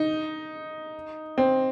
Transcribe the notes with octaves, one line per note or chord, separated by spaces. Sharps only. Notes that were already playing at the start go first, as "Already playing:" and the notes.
Already playing: D#4
C4